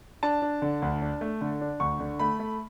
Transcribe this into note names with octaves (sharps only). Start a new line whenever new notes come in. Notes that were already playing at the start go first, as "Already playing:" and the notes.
D4 A5
D4
D3
D2
D4
A3
D3
D4
D2 C#6
D3
A3 B5
A3